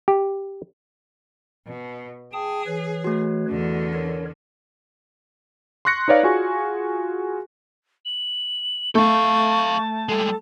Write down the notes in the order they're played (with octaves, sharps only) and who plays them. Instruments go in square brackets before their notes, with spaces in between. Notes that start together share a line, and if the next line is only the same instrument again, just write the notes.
[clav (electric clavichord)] G4
[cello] B2
[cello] G#4 [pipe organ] G5 A5 D#6
[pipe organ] E3 B4 C#5
[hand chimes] A3 F#4
[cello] E2 D3
[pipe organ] A#4 C#5
[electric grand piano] C6 C#6 F#6 A#6 C#7
D#4 B4 C#5 D5 F5
F4 F#4 G#4 G#5 C#6
[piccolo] F#7
[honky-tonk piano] A3 [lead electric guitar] A4 F5 [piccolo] A5 [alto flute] C#6
[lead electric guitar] G3 G#3 [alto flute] A4